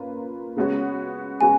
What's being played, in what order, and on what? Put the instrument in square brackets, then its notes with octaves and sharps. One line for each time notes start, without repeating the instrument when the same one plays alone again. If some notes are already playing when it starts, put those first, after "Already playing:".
Already playing: [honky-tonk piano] A#3 C#4 F4 B4
C#3 G#3 B3 F#4 C#5
[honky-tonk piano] C#3 G#3 B3 F#4 [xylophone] G#5